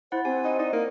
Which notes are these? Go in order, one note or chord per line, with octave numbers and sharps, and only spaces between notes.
E4 C5 F#5
C4 G4 G#5
D#4
D#4 D5
A#3